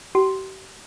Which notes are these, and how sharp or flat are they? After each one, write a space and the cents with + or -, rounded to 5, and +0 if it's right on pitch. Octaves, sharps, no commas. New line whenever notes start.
G4 -40 C6 +0